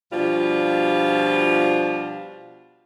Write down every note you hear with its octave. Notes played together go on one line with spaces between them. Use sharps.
B2 F3 G3 D4 F4